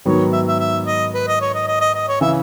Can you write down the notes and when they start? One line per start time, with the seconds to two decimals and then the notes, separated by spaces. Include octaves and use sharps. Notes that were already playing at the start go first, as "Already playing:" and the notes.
0.05 G#2 D#3 F#3 B3 C#5
0.32 E5
0.48 E5
0.59 E5
0.87 D#5
1.14 B4
1.27 D#5
1.41 C#5
1.54 D#5
1.67 D#5
1.81 D#5
1.94 D#5
2.08 C#5
2.21 C#3 E3 E5